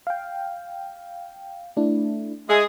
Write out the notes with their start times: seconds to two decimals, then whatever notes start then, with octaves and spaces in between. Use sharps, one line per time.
0.07 F5 G5
1.77 A3 D4 E4
2.49 G#3 G#4 E5 E6